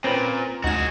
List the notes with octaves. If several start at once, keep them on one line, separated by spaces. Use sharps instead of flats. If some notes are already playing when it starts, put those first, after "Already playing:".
A#2 C4 C#4 B4
D2 D#4 F#4 G#4 E7